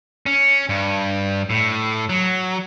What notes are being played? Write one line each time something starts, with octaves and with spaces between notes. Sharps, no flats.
C#4
G2
A2
F#3